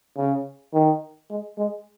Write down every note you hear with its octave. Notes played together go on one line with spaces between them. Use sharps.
C#3
D#3
G#3
G#3